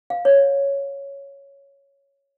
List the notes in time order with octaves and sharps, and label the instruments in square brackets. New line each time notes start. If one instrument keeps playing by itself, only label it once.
[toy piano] F5
C#5